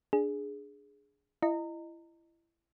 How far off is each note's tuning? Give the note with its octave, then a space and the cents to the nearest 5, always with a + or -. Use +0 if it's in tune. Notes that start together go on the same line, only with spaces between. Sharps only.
D4 +0 G#4 +0
E4 +25 D#5 -15 A#5 -25